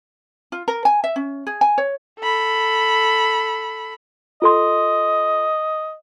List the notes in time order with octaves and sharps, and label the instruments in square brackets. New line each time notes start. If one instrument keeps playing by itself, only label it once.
[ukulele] F4
A#4
G#5
E5
C#4
G#4
G#5
C#5
[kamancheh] A4 B5
[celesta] F4 A4 C6 [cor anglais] D#5